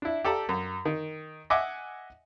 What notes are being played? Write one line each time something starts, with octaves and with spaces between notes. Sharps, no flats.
D4 E4
G4 A4 D5 A5 A#5
F#2
D#3
D#5 E5 F#5 G#5 D6